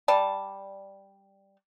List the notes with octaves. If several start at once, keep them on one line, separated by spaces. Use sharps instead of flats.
G3 D5 A5